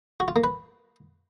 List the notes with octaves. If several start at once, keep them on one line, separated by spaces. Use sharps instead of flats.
F#4
F4
A#3
B4